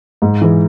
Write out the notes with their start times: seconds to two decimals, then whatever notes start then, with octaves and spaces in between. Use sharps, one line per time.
0.22 G#2
0.41 E3 G#3